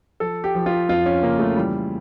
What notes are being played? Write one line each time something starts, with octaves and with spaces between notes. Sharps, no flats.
F3 A4
G4
F3
F4
F2 F4
C#4
C#3 A#3
A3
E3 G3